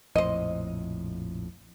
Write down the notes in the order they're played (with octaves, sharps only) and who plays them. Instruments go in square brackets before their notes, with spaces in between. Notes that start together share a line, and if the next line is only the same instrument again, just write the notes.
[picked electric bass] A#1 F2 A2 [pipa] C5 D#5